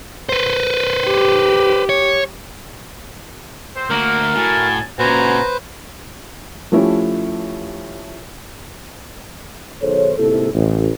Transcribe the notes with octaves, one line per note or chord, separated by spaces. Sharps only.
B4 C5
G4
C#5
C4 C5
D2 A#3 F#4 A#4
A2 F#4 G#5 A5
A#2 C#3 F#4 B4 C5 G#5 A#5
F3 A3 C#4 E4 G4
B1 D#3 G#4 A4 C5 C#5
G1 G#2 C3 A#3 E4 A4
A1